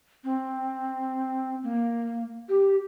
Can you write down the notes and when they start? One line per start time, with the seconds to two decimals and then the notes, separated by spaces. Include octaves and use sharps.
0.24 C4
1.63 A#3
2.49 G4